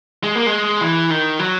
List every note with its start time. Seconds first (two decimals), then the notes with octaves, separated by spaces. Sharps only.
0.23 G#3
0.35 A#3
0.46 G#3
0.81 E3
1.10 D#3
1.39 F#3